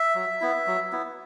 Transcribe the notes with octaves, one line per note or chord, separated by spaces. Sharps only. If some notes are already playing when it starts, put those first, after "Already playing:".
Already playing: E5
F#3
B3 E4
F#3
B3 E4